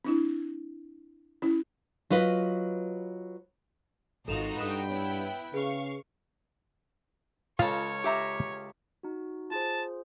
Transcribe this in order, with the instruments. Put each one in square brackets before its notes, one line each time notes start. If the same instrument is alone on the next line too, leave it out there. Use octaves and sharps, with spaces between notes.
[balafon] C4 D4 E4
C#4 E4
[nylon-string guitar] F#3 F4 B4 D#5
[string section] G#1 [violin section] D#4 F4 F#4 [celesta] A4 E7 F7
[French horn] G2 [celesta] A4 D#6 E7 [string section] B4 G5
[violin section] B3 E4 [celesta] C#5
[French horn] C#3 [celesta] G#4 B4 [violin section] F5 C#6
[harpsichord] C#2 C#3 A4 [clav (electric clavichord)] F4 F5 [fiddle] C#5
[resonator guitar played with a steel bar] G4 E5 A#5
[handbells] D#4 F#4
[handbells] F4 G#4 C5 [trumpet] A5